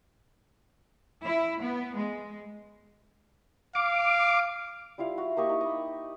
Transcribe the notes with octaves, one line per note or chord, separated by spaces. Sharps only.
E4
B3
G#3
F5 D6
G3 E4 F4 F5
F#4
A#3 G4 D#5 C#6
D#4
D#5 B5